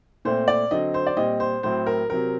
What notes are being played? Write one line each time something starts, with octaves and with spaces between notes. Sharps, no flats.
A#2 A3 C4 C5
D5
D3 F#3 C4 D#5
C5
D5
A#2 G3 C4 D#5
C5
A2 F#3 A3 C4 C5
A#4
C3 F#3 C4 A#4